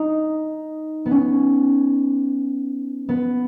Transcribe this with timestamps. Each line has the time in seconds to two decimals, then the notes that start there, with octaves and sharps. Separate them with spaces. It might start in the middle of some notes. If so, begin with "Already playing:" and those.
Already playing: D#4
1.06 B3
1.11 C#4
3.09 B3